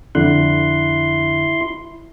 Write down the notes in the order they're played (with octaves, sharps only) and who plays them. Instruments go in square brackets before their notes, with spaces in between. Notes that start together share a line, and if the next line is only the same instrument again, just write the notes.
[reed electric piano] F2 D3 F#6 [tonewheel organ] E4 C6